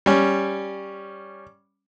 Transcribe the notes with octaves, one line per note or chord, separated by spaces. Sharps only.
G3 C#4